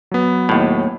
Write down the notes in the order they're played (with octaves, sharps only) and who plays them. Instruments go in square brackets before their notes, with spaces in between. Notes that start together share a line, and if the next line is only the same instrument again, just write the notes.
[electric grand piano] F#3 B3
[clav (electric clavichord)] D#2 A2